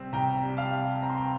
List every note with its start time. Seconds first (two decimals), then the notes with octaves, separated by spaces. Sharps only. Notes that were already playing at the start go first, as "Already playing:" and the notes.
Already playing: C3 G3 C4
0.13 C2 G5 A#5
0.43 G3
0.57 F5 A5
0.72 C3
1.02 C4 A#5
1.10 C6
1.17 G5 A#5